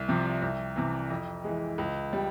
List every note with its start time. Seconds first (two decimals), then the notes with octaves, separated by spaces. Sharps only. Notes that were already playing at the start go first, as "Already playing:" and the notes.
Already playing: C2
0.08 C3 F3
0.42 C2
0.76 C3 E3
1.10 F2
1.44 E3 G#3
1.78 C#2
2.13 G3